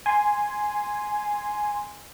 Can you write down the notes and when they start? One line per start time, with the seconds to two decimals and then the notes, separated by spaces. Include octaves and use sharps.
0.06 G#5 C6